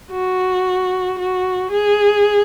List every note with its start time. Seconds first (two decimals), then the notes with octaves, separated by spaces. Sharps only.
0.11 F#4
1.18 F#4
1.71 G#4